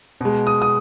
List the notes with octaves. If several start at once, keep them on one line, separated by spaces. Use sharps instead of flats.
B2 G#3
D#6
D#6